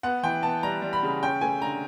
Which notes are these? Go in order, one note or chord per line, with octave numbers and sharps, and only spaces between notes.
B3 F#5
E3 G5
B3 A5
G3 A#5
G3
B5
C#3
C#4 G5
A3 G#5
D3 A#5